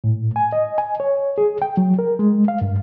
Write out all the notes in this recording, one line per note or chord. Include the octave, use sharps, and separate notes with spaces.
A2
G#5
D#5
G#5
C#5
G#4
G5
F#3
A#4
G#3
F5
G2